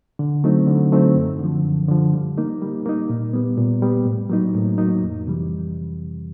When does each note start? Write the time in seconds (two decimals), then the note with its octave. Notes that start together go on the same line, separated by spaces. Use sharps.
0.19 D3
0.44 F#3 A3 C4 D#4
0.67 D3
0.92 F#3 A3 C4 D#4
1.15 F#2
1.40 D3 F3
1.64 F#2
1.88 D3 F3
2.13 G3
2.37 A#3 D#4
2.62 G3
2.86 A#3 D#4
3.09 A#2
3.33 G3 B3
3.58 A#2
3.82 G3 B3
4.06 A2
4.30 F#3 A#3 D#4
4.55 A2
4.78 F#3 A#3 D#4
5.02 F2
5.27 C3 E3 G3